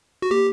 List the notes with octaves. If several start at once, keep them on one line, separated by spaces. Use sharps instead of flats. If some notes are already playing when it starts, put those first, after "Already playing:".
F#4
A#3 G4